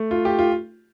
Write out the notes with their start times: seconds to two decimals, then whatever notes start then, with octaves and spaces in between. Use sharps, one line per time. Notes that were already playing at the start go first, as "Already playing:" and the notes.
Already playing: A3
0.11 F4
0.25 G4
0.39 F4